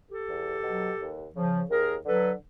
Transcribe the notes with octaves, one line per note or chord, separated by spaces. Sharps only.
G4 A4
E2
B2 F#3
D#2
C#3 F3
D#2 G#4 A#4
D3 F#3 A4 B4